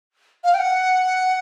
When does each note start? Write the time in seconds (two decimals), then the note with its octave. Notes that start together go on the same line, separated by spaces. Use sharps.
0.44 F5
0.54 G5
0.59 F#5